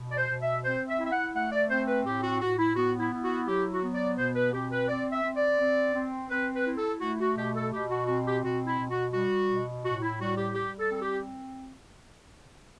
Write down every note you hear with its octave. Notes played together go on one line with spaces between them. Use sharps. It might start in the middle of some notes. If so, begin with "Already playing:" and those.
Already playing: B2
D5
C5
B2
E5
C4 C5
E5
E4
E5
F#5
A3 F#5
D5
C4 C5
B4
A2 G4
F#4
A2 F#4
E4
B3 F#4
E4
E4
F#4
F#3 G4
F#4
B3
D5
B2 C5
B4
C4 G4
B4
C4 D5
E5
C4
D5
C4
C4
C4 B4
B4
E4
A4
A3 F#4
F#4
B2 G4
A4
B2 G4
F#4
C4 F#4
G4
B2 F#4
E4
B2
F#4
G3 F#4
B2
A2 F#4
E4
G3 F#4
G4
G3 G4
A4
C4 A4
G4